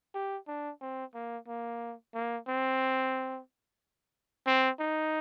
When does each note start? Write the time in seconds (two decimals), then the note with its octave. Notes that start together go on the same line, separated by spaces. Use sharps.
0.14 G4
0.48 D4
0.81 C4
1.15 A#3
1.48 A#3
2.14 A#3
2.48 C4
4.46 C4
4.80 D#4